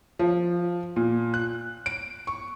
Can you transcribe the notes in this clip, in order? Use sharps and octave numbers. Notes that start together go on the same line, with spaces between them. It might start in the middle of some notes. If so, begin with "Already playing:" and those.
F3
A#2
F#6
D7
C#6